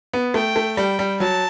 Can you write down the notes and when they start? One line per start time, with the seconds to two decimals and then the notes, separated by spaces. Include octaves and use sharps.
0.13 B3
0.34 A3 G5
0.56 A3
0.77 G3 G5
0.99 G3
1.20 F#3 A5